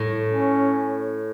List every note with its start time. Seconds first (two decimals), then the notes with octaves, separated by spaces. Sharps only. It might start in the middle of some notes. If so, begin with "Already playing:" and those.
Already playing: A2
0.28 C#4